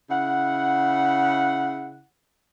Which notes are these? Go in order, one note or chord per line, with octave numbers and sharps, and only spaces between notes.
C#3 E4 F#5